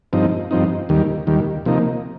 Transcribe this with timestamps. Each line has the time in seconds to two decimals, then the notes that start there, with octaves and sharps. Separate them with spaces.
0.13 G2 F3 C4 D#4
0.51 G2 F3 C4 D#4
0.89 D#2 D#3 G3
1.27 D#2 D#3 G3
1.66 C3 F3 A#3 D#4